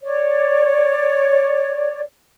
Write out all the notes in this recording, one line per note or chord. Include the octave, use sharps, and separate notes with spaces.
C#5 D5